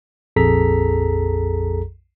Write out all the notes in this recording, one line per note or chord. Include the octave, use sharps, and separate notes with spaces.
A#1 F2 G#4 A4 A#5 B6